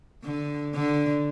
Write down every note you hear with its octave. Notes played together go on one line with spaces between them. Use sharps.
D3
D3